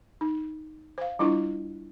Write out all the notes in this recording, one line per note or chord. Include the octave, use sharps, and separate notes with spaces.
D#4
C5 F5
G3 D4 E4 F4